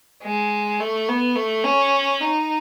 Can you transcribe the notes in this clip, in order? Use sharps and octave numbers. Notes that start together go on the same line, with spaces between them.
G#3
A3
B3
A3
C#4
D#4